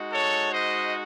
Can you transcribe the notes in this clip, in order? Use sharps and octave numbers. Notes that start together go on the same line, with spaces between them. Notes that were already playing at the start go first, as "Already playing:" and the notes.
Already playing: G#3 D#4 F#4
A4 C#5
C5 D#5